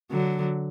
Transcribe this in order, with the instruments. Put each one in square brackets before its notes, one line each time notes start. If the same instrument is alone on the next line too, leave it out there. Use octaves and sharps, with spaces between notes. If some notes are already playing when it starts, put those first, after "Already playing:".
[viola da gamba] D3 F#3